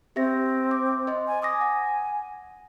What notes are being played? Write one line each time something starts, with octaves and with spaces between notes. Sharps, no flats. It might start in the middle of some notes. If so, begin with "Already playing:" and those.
C4 G4 E5 A#6
D6
C5 D#5 C6
G#5
G#5 D6 D#6 A#6
F#5